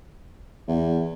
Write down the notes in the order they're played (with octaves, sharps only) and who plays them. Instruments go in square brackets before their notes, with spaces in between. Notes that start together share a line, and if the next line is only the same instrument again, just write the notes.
[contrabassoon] E2